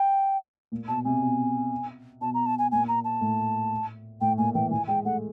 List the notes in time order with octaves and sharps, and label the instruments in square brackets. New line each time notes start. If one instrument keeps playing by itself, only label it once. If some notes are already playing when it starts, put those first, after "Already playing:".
Already playing: [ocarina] G5
[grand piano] A#2
[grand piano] B2 [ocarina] A5
[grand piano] C3 [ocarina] G#5
[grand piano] B2
[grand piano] B2 [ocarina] A5
[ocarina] A#5
A5
G#5
[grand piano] A#2 [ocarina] G#5
[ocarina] A#5
A5
[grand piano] A2
[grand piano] A2 [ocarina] G5
[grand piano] A#2 [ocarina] G#5
[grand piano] E3 [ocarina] G5
[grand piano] E3 [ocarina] G#5
[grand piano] G#3 [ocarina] G5
[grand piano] A3 [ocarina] F#5